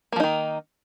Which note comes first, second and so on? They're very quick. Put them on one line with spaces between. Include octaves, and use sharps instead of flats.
A#3 F3 D#4 D#3